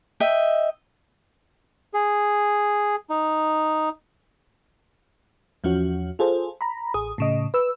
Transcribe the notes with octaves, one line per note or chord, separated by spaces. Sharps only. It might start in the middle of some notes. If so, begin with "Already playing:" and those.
D#5 E5 G5
G#4
D#4
E2 F3 C#4 F#4
F4 G#4 A4 C5
A#5 B5
A1 G#4 D#6
A2 C#3 D#5
B4 E6